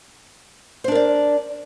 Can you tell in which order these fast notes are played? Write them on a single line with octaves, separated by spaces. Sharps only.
C5 D4 A#4 D5